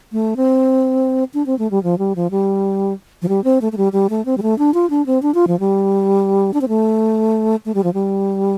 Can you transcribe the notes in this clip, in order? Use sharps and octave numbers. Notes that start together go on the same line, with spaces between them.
A3
C4
D4
C4
A3
G3
F3
G3
F3
G3
F3
G3
C4
A3
A3
G3
G3
A3
C4
G3
A3
D4
F4
D4
C4
D4
F4
F3
G3
D4
C4
A3
A3
G3
F3
G3